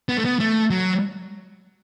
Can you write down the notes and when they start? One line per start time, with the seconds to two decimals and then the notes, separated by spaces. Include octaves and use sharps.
0.09 B3
0.17 A3
0.25 B3
0.40 A3
0.70 F#3